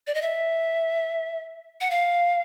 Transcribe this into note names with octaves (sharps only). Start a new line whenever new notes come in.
D5
D#5
E5
F#5
F5